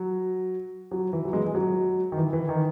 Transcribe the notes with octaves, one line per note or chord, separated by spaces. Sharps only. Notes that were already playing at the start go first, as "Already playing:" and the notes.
Already playing: F#3
F#3
E3
F#3
G#3
G#3
F#3
D#3
E3
E3
D#3